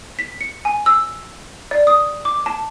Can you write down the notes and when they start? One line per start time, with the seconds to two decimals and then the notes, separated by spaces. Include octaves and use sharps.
0.19 B6
0.41 C#7
0.65 G#5
0.86 E6
1.71 D5
1.87 D#6
2.25 D6
2.46 A5